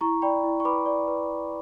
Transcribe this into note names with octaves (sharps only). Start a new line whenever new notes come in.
E4 A#5 C#6
D5 G5 B5
E4
C#6
B4 B5 D6
D5
B4